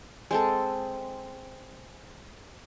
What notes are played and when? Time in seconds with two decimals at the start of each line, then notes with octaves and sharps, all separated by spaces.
0.31 G#3 C4 A4